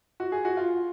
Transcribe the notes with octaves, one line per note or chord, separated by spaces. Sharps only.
F#4
G#4
F#4
F4